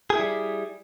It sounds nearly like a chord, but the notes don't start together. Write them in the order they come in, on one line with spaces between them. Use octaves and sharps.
G#4 E4 G3